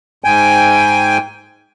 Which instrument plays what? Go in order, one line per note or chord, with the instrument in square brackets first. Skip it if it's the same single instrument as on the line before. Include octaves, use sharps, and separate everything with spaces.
[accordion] G#2 G5 G#5